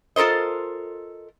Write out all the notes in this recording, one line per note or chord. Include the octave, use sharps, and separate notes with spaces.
F4 A4 A#4 C5 D#5